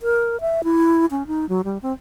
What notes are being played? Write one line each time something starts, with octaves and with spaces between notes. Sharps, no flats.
A#4
E5
E4
C#4
D#4
F#3
G3
C4